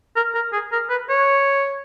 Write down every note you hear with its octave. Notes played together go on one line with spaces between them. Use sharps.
A#4
A#4
G#4
A#4
B4
C#5